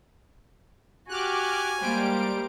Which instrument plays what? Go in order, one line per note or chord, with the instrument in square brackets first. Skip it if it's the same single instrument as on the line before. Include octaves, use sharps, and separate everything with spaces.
[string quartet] F#4 G4 [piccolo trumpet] G#5 [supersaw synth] D6 F6 F#6
[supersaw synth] G3 D7 [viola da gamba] G#3 A#3 A#4 [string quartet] G4 C5